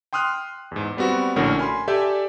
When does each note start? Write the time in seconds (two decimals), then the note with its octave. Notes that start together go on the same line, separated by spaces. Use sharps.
0.13 G5 C6 D#6 F6 F#6
0.71 E2 G#2
0.97 G3 B3 C4 F#4
1.36 A#1 A2 D3 C#4 F#4 A#4
1.59 G#5 B5 C6
1.88 G4 A4 D5 E5 G#5 G6